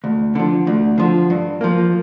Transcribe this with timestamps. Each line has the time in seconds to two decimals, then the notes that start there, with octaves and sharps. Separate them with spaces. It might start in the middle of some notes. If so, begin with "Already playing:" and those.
0.04 D2
0.35 D3 F3
0.67 D2
0.98 D3 F3
1.30 G2
1.61 F3 A#3